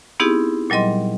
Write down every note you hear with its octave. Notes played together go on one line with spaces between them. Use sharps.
B3 C4 D#4 E4 G4 G#4
A#2 F#3 G3 D#5 C6